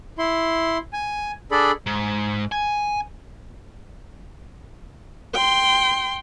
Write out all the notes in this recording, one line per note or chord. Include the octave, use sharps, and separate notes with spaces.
E4 C6
G#5
D4 G#4 A4 D5 B5
G#2
G#5
G5 C6